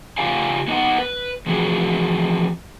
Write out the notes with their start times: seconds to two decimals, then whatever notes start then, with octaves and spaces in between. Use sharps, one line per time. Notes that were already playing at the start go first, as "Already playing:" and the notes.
0.18 C#3 F4 G4 D5 F5 G#5
0.68 B3 D#4 F4 D#5 F#5
0.98 B4
1.46 E3 F3 C4 F#4 G#4 B4